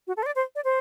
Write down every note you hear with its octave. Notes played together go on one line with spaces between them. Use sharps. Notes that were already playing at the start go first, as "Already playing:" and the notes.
F#4
A4
C5
D5
C5
D5
C5